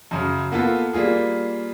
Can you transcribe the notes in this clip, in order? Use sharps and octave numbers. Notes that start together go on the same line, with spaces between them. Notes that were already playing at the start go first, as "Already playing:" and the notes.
F#2 C#3
A#3 B3 F4 A4
G3 A#3 F4 G#4